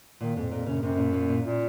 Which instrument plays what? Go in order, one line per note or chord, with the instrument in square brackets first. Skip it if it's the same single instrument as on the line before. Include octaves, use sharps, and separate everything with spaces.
[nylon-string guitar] A#2 [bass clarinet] D#3
[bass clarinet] F2 [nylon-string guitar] G#2
[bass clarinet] F2 [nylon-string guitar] A#2
[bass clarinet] F#2 [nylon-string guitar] C#3
[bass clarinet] F#2 [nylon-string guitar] C3
[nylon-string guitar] A#2
A#2
A#2
[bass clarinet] A#2